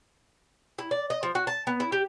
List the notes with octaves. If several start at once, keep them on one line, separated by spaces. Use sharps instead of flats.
E4
D5
D#5
F3
F#4
A5
B3
E4
G4